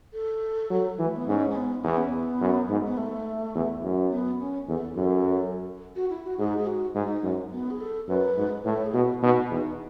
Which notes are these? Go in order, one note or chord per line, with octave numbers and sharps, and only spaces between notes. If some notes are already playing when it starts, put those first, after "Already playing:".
A4
F#3
E3
A3
B3
G#2 C#4
C#4
B3
E2 B3
C#4
B3
F#2
G#2
B3
A3
E2
F#2
B3
C#4
E2 A4
F#2 A4
F#4
E4
F#4
G#2 G#4
G#4
F#4
G#2 D#4
F#2
B3
G#4
A4
F#2 B4
G#2
A2 A4
G#4
B2 F#4
B2 D#4
E2 D#4